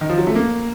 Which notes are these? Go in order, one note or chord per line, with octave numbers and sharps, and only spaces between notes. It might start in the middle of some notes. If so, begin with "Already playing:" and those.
D#3
F3
F#3
A3
A#3